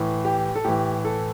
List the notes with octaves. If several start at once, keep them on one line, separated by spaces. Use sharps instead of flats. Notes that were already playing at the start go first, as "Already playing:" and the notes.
Already playing: A2 E3
G4
A4
A2 E3 G4
A4